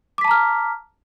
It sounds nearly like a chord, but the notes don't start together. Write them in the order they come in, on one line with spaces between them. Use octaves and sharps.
D6 B6 A5 A#5 F6